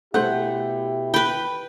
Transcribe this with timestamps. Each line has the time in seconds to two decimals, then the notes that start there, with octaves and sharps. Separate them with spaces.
0.14 B2 A3 E4 G4 C5 F#5
1.14 B4 G5 B5